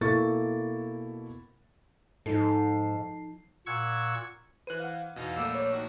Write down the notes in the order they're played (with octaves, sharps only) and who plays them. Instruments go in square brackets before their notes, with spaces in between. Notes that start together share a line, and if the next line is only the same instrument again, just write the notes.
[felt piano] B2 A#3 E4 A4 C#6 A6
[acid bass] G#2 [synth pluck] F3 D#4 C7 [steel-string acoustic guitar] A4
[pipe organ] A#2 F#5 C#6 E6 G#6
[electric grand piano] E3 C5 D#7 [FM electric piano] B4 F#6
[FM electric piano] F5 F#5
[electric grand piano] E2 B2 [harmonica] D#4
[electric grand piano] A#1 A3 A#3 [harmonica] G3 E6
[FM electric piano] C#5
[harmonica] D#3 F#4